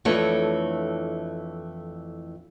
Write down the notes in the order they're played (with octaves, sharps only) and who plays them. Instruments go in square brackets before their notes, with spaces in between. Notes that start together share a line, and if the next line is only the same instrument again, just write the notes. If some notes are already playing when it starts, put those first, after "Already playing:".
[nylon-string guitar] F2 E3 A3 D4 A4 C#5